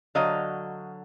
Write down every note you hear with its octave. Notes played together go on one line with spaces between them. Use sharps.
D3 F#3 D#5 F5